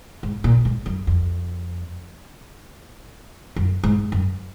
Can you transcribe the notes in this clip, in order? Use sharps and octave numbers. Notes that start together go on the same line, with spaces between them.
G#2
A#2
G#2
F#2
F2
F#2
G#2
F#2